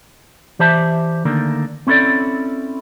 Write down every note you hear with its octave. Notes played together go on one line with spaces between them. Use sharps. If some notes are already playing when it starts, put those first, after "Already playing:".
E3 G4 C5 D5 E5 A5
D2 D3 D#3 A#3 D4
C4 C#4 E4 G#4 A4 D5